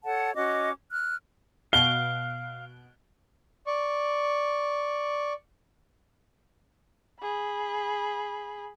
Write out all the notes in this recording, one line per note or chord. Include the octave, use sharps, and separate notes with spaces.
A4 C#5 F#5 A5
C#4 F#4 D#5 D6
F6 F#6
B2 F5 F#6 D7 G7
D5 C#6
G#4 B5